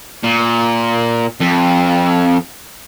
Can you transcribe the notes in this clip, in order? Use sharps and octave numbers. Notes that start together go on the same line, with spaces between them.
A#2
F2